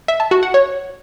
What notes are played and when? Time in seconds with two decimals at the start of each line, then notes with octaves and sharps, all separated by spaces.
0.08 E5
0.20 A5
0.31 F#4
0.43 F#5
0.54 C#5